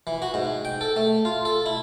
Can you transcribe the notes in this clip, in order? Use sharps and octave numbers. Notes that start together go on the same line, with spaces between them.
E3
F#4
G#2
G5
A4
A3
F4
A4
E4